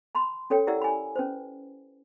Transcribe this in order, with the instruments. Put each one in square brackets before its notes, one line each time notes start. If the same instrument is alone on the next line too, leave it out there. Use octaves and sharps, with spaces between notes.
[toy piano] A5 B5 C6
C#4 A4 C#5 G5
E4 G4 A#4 D5 F#5 E6
G#5 B5
C#4 B4 C5